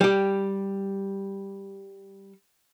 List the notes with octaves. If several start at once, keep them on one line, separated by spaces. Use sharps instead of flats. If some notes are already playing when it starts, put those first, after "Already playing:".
G3 G4